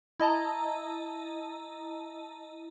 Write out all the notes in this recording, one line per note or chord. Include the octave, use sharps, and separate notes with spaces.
E4 D#5 A5 A#5